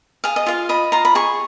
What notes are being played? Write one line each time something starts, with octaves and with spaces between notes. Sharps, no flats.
G#4 F5
D#5
F4 F5
D#5 B5
F4 A#5
B5
G#4 C#6